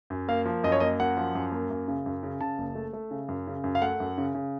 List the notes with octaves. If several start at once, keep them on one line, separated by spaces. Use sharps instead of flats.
F#2
A#3 F5
F3
F#2 D#5
C#5
A#3 D#5
F#2 F#5
F3
F#2
A#3
F#2
C#3
F#2
C#3
C#3 A5
F#1
A3
A3
C#3
F#2
C#3
F#2
F5
A3 F#5
F#2
C#3
C#3